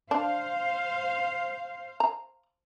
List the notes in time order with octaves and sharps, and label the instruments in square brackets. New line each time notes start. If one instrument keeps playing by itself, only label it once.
[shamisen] D4 [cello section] C5 F5
[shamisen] A#5